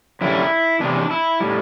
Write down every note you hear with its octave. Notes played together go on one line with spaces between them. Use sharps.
F#2 D3 G3 E4
E2 C3 E3 D4
E4
A2 G3